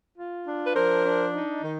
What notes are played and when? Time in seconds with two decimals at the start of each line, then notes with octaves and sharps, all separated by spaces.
0.18 F4
0.48 D4
0.65 B4
0.76 F3 A#4 C5
1.05 D4
1.34 D#4
1.63 D#3